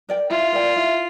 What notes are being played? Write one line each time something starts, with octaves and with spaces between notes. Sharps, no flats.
A#4 D5 G5
E4 F4
A#4 D5 G5
E4